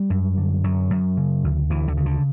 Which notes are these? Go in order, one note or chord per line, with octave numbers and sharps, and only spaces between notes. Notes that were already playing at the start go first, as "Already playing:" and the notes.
Already playing: G3
F#2
D3
F#2 F#3
F#2
C#3
D2
D2 E3
D3
C#3
D3